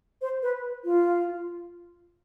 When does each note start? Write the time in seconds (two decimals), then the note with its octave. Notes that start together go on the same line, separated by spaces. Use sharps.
0.22 C5
0.43 B4
0.85 F4